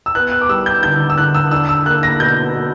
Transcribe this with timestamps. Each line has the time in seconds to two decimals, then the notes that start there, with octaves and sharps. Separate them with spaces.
0.06 E6
0.15 B3 F#6
0.32 F#6
0.41 D6
0.49 G3 E6
0.66 G6
0.83 D3 G6
1.10 E6
1.18 D3 F#6
1.35 E6
1.51 D4 E6
1.69 E6
1.86 A#3 F#6
2.03 A#6
2.20 B2 G6
2.54 B2